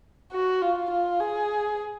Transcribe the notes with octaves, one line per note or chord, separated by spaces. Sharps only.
F#4
F4
F4
G#4